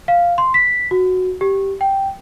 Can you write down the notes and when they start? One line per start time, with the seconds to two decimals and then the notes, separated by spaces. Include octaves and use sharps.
0.08 F5
0.38 C6
0.54 B6
0.91 F#4
1.41 G4
1.81 G5